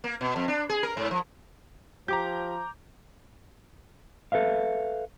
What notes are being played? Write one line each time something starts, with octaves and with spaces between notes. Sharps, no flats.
A#3
B2
F2
D4
G#4
A#4
G#2
F3
F3 G4 A#5 D6 G6
A4 B4 E5 F5